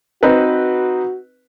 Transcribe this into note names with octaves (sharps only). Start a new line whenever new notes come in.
C4 D#4 F#4 B4